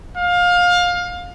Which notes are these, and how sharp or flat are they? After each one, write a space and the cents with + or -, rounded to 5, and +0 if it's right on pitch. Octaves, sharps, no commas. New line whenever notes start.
F5 +25